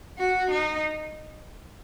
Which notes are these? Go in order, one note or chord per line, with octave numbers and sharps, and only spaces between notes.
F#4
D#4